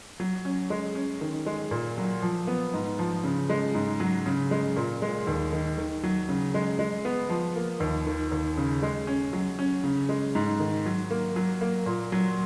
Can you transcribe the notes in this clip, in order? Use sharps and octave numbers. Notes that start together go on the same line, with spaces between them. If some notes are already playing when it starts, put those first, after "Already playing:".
F#3
C#4
G#3
C#4
D#3
G#3
A#2
F#3
F3
B3
G#2
F3
C#3
G#3
G#2
F#3
C#3
G#3
A#2
G#3
D#2
D#3
D#3
F#3
C#3
G#3
G#3
B3
F3
A#3
D#2
D#3
D#2
C#3
G#3
C#4
F#3
C#4
C#3
G#3
G#2
D#3
F#3
A#3
F#3
A#3
A#2
F#3